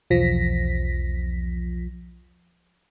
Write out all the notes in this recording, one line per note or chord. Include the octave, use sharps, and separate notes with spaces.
B1 E2 F3 A#6 B6